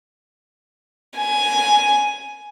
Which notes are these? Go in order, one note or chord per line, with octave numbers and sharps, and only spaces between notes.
G#5